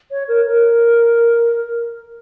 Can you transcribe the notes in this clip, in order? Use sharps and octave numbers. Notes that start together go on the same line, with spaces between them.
C#5
A#4
A#4